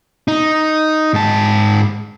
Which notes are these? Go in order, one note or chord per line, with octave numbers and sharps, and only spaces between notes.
D#4
G#2 A5